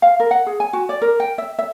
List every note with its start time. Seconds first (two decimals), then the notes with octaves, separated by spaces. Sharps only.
0.02 F5
0.20 A#4
0.31 F#5
0.46 G#4
0.60 G#5
0.73 F#4
0.89 D5
1.02 A#4
1.20 G5
1.38 E5
1.59 E5